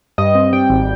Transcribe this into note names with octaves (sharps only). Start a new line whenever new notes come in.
G2 D#5
C4
G3 G5
G#1